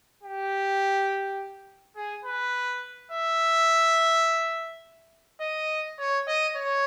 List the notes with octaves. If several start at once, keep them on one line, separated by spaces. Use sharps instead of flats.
G4
G#4
B4
E5
D#5
C#5
D#5
C#5